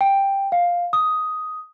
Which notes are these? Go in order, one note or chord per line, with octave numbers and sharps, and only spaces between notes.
G5
F5
D#6